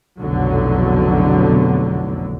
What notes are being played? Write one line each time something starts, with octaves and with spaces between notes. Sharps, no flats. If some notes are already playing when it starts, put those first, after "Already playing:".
F1 B1 E2 D3 F#3